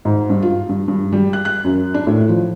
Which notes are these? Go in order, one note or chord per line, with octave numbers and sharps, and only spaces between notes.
G#2
G2
F4
G2
G2
G3
F#6
F#6
F#2
D4
A2
F3